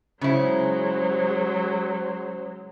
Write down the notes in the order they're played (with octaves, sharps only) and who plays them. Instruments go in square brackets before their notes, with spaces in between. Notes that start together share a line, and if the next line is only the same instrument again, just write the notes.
[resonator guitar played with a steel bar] C#3 E4 [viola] F#3 G#3 [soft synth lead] C5